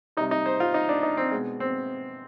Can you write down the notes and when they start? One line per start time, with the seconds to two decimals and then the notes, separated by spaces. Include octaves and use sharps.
0.17 C3 D#4
0.20 G3
0.31 D#4
0.46 C5
0.60 F4
0.74 D#4
0.89 D4
1.03 D#4
1.17 C4
1.31 B2 G#3
1.60 C4